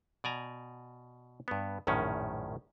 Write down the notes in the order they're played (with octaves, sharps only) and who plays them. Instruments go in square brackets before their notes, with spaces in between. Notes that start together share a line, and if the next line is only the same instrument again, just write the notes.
[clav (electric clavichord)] B2 D5 G#5 A#5
G2 B3
A#1 F#2 A2 D#3 C#4